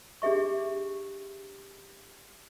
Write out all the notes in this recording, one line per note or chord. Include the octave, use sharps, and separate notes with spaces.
D4 G4 G#4 E5 C#6